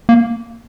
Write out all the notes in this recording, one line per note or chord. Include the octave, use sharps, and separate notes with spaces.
A#3